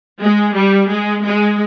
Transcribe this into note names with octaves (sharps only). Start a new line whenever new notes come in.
G#3
G3
G#3
G#3